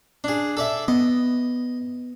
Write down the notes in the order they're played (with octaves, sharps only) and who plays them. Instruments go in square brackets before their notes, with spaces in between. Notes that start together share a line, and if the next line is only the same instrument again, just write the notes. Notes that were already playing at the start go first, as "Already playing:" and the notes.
[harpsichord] D4 G#4
A4 D5 E5
[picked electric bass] B3 [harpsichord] D#5